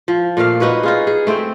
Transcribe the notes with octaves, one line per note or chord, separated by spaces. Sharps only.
F3
A#2 A3 A#3 F5
D#4 F#4 B4 C#5
D#4 F4 G#4
G#4
A3 C4 E5 G5